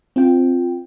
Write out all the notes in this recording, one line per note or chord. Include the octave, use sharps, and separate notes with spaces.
C4 F4 G5